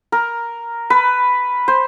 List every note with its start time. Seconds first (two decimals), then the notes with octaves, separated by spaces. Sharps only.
0.12 A#4
0.90 B4
1.68 C5